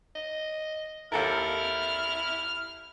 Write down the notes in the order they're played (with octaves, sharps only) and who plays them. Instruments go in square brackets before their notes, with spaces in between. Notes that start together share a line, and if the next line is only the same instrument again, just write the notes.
[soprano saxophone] D#5
[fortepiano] D#2 A4 A#4 [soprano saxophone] E4 [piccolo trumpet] F6